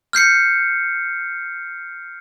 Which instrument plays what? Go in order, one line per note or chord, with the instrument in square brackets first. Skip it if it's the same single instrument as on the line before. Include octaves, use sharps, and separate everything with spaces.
[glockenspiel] F6 G6 C7 C#7